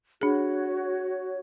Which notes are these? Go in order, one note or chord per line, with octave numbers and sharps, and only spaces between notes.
D4 F#4 G#4 C#5